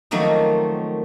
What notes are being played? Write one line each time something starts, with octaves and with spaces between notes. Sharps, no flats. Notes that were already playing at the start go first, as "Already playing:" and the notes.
D#3 F3 F#3 A3 A#3 C4